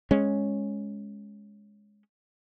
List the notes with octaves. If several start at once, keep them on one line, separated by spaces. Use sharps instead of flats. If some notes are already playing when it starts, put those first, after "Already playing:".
G#3 C#4